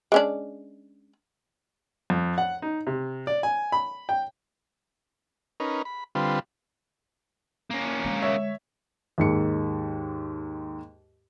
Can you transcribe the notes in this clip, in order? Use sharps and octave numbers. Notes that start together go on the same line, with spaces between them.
G#3 C#4 D4
F2
F#5
D#4
C3
D5
G#5
B5
G5
C#4 D#4 A#4 B4
B5
D3 G3 C4 F4 B4
A#3 C#4
D3 G#3
C#5 E5
D#2 G#2 C#7